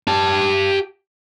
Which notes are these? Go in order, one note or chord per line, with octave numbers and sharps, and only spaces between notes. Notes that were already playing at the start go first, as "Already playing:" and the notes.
G4 A5